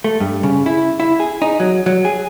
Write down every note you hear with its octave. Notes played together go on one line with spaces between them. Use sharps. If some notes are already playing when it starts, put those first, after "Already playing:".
A3
G2
C#3
E4
E4
G#4
D#4
F#3
F#3
G#4